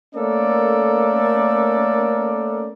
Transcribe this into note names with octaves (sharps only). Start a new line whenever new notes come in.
A3 A#3 C#4 A4 A#4 D5